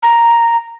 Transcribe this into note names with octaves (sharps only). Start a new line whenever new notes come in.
A#5